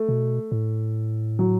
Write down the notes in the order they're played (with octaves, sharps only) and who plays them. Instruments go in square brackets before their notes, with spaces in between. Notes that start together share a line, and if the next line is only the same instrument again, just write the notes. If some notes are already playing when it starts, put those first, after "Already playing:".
Already playing: [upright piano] A3
[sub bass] B2
A2
[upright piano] F#3